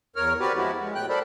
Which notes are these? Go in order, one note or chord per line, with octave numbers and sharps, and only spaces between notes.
E2 A#4 C#5 F6
C4 F#4 G4 B4 D5
F3 G#3 B3 E4 F#4 G4
G#3
A2 G5 F#6
A4 A#4 C5 D5 B5